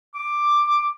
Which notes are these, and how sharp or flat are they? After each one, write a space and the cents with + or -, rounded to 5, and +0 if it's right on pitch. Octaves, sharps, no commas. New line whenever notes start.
D6 +10